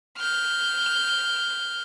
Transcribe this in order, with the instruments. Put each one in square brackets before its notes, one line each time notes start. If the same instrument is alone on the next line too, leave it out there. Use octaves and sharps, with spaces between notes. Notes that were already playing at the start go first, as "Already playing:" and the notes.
[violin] F6 G6